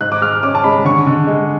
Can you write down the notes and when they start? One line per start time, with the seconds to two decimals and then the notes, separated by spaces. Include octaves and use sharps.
0.01 G#2 F#6
0.12 D6
0.21 G#3 F6
0.43 C#4 D6
0.55 A5
0.64 G#3 B5
0.85 D3 C#6
1.06 D3
1.27 G#3